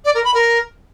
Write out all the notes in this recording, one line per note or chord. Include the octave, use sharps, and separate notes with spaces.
D5
A#4
B5
A#4